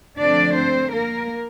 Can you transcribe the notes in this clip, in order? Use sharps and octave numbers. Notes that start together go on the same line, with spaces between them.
D3 F3 A3 C4 D4 D5
C4 C5
A#3 A#4